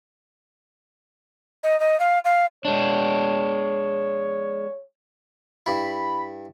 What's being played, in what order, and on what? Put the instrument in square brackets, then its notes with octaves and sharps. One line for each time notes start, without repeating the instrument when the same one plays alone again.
[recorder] D#5
D#5
F5
F5
[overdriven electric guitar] G#3 D4 [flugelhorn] C#5
[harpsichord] G2 E4 [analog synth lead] B5